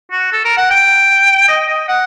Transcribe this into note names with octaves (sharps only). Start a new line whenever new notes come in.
F#4
A4
A#4
F#5
G5
D#5
D#5
F#5